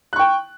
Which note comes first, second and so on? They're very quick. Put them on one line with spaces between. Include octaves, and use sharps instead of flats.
F#6 C#6 G5